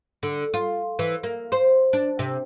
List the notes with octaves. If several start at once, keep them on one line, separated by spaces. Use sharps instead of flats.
D3
F4
E3
A#3
C5
D4
C3